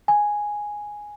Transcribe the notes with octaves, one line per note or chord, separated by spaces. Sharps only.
G#5